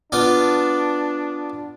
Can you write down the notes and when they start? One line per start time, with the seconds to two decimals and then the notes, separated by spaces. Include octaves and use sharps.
0.12 B3 D4 F4 D5